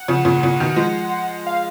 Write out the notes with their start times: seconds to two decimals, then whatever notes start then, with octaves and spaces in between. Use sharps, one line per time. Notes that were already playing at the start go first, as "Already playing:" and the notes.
Already playing: F#5
0.08 C#3 F3
0.25 A#2 C#3
0.43 A#2 C#3
0.60 B2 D#3
0.76 F3 G#3
1.47 F5